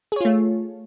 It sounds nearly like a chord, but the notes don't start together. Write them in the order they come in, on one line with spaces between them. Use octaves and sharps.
G#4 C#5 F4 A3